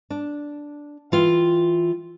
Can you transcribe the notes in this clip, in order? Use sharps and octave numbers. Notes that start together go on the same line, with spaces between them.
D4
E3 F4 G5